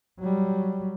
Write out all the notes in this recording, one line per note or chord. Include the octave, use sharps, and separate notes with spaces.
F#3 G3